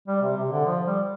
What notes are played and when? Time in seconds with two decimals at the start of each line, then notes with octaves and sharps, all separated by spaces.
0.08 G3
0.22 C3
0.37 C3
0.52 D3
0.66 F3
0.86 G3